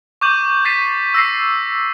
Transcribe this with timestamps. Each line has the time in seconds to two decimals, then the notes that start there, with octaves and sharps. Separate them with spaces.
0.21 C#6 D6 G6 D#7 F#7
0.65 G6 A6 B6 C7 D#7
1.14 E6 A#6 C7